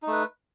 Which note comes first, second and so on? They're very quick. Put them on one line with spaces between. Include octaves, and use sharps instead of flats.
D#4 A3 B4